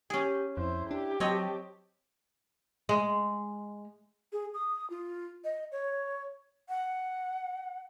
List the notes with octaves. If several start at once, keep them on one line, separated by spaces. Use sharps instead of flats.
C#4 G4 G#4
F2 E4 C5
D4 G4
F#3 C4 C#5 D#5 A5
G#3
G#4
D#6
F4
D#5
C#5
F#5